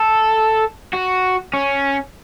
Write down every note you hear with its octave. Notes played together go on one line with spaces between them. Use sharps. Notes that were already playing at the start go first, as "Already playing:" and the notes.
Already playing: A4
F#4
C#4